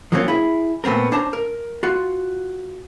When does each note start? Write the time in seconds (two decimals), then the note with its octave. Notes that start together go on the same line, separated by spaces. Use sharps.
0.12 F3 F#3 A#3 C4 C#4 F4
0.28 E4 G#4
0.84 A#2 A3 B3 C4 A#4
1.11 C#4 D4 C5 A5 A#5
1.33 A#4
1.83 F4 F#4